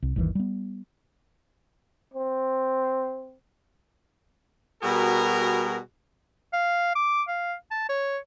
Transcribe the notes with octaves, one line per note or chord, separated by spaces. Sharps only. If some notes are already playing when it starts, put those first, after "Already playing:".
C2
G1 D#2 D#3 E3
G3 B3
C4
B2 G3 F#4 G#4 A#4
F5
D6
F5
A5
C#5